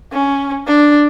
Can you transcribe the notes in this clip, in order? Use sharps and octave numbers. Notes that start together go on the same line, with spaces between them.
C#4
D4